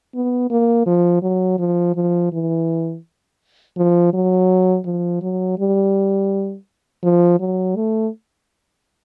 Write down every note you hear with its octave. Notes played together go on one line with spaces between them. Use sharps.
B3
A#3
F3
F#3
F3
F3
E3
F3
F#3
F3
F#3
G3
F3
F#3
A3